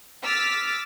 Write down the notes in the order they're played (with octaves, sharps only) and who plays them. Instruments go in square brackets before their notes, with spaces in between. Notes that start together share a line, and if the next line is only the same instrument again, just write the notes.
[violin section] D6 E6 F6 A6 B6